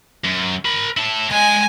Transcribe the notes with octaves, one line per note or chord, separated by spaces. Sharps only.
F#2
A#4 B5
E4 A5
G#3 G#5